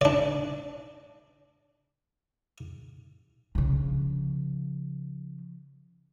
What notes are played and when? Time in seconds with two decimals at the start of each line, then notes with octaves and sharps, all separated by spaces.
0.01 D4 D5
3.55 C#3 F3